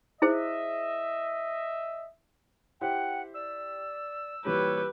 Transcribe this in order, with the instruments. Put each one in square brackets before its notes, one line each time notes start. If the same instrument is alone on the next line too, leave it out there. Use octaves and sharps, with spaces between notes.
[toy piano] E4 G#4 C5 [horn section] D#5 E5
[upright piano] E4 G4 C5 [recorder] F#5 [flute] G5
[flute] D5 [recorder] E6
[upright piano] A#2 E3 G3 [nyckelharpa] G4 B4 [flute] C#5